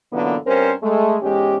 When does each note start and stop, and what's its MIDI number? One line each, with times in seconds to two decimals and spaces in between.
0.12 0.36 42
0.12 0.36 46
0.12 0.36 50
0.12 0.36 52
0.12 0.36 58
0.12 0.36 59
0.46 0.74 43
0.46 0.74 60
0.46 0.74 61
0.46 0.74 70
0.46 0.74 72
0.82 1.17 56
0.82 1.17 57
1.22 1.58 40
1.22 1.58 44
1.22 1.58 56
1.22 1.58 61
1.22 1.58 67